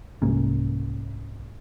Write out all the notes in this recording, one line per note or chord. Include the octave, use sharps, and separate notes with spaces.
C2 G#2 A#3 C#4